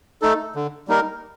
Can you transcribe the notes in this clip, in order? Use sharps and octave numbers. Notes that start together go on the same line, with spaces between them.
A3 D#4 A4
D3
G3 A#3 D#4 A#4